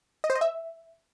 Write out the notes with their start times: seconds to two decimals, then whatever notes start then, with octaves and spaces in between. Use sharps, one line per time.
0.24 D#5
0.30 C5
0.35 D#5
0.41 E5